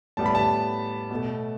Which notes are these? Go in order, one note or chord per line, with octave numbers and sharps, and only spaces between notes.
A2 G3 B3 A5
B5
A5
B2
A3